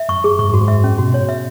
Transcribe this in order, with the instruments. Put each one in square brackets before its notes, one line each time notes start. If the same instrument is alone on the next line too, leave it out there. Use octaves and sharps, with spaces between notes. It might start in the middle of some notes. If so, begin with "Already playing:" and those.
Already playing: [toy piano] E5
[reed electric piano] F#2 [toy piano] C#6
[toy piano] G#4
[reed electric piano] G#2 [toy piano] C#6
[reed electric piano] F#2 [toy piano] F#4
[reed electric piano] G#2
[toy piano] E5
C#4
[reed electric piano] B2 [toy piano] F#4
[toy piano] C#5
E5